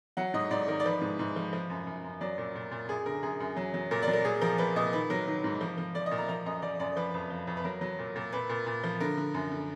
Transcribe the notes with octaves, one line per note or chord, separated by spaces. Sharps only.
F#3 F#5
G#2 D#5
G#2 D5
D#3 A#4
D5
F3 B4
G#2
G#2
F3
F3
F#2
F#2
F#2
F#3 D5
A#2
A#2
A#2
F#2 G#4
D3 A#4
F#2 G#4
F#2
F#3
F#3
A#2 A#4
F#3 D5
A#4
A#2 G#4
F3 A#4
F3 B4
A#2 D#5
D#3 B4
F#3 A#4
D#3
G#2
F3
F3
F3 D5
D#5
A#2
A#5
F3 A#5
F#2 D#5
F3 D5
F#2 D5
F3 B4
F2
F3
F2
B4
F#3 A#4
F#3
A#2
A#2
A#2 B4
A#2
A#2
F3
D3 A#4
D3
F#2
D3